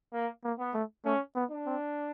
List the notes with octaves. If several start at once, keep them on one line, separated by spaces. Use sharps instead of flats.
A#3
A#3
B3
A3
A3 C#4
B3
D4
C4